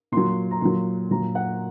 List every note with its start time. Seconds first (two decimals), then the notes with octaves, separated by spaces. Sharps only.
0.12 A#2 F#3 C6
0.51 A#5
0.61 A#2 F#3 C6
1.11 A#2 F#3 A#5
1.35 F#5